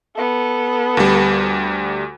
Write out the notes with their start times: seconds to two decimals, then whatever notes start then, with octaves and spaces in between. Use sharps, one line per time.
0.16 B3 A4
0.97 D2 G3